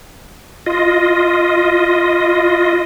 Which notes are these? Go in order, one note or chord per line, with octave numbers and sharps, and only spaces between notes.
F4 D#5